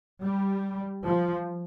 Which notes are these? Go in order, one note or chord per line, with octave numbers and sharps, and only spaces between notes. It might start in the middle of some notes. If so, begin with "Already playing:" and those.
G3
F3